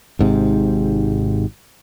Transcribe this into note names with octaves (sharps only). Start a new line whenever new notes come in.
G#1 G#2 C3